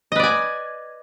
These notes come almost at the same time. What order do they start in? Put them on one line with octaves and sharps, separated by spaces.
D#5 B4 D5 G#5